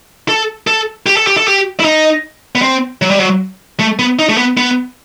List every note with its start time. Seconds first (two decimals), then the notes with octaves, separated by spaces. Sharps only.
0.29 A4
0.67 A4
1.06 G4
1.17 A4
1.27 G4
1.37 A4
1.48 G4
1.80 E4
1.85 D#4
2.55 B3
2.62 C4
3.02 F#3
3.11 G3
3.20 F#3
3.80 A3
3.99 B3
4.19 D#4
4.29 A3
4.38 B3
4.57 B3